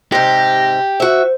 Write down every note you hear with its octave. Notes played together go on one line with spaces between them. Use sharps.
G#2 C3 G4 A#6
F#4 C5 E5